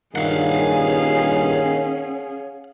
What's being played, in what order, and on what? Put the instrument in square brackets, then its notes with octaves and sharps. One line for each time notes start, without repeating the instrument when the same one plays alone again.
[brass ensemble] G2 A#2 [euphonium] D#3 [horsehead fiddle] C#4 G#4 [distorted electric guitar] F5 F#5